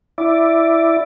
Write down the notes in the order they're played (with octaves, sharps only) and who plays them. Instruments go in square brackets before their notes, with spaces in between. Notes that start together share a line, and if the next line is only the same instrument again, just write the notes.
[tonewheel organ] E4 D5